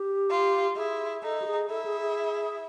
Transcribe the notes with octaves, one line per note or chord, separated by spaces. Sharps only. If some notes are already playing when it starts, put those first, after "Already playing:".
Already playing: G4
F4
E4 G#4
D#4 A4
G4
G#4
E4 A4
G#4
G#4